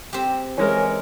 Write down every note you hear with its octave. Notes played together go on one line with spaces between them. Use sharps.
C4 G4
E3 G#3 C#4 A#4